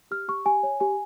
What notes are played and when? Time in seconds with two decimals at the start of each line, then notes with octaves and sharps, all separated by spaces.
0.11 G4 F6
0.28 G4 C#6
0.46 G4 G#5
0.63 C#5
0.80 G4 G#5